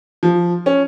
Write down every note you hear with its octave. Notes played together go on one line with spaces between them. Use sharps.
F3
C#4